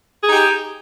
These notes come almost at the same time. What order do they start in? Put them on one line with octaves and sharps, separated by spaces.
G#4 D#4 G4